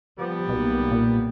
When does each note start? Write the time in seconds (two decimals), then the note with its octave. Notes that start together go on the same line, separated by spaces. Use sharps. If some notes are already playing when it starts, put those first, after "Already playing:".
0.18 F3 G3 B3
0.49 B1 B2 A#3
0.91 A#2